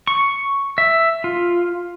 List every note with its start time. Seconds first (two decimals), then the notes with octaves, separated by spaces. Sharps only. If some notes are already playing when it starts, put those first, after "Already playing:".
0.07 C#6
0.78 E5
1.24 F4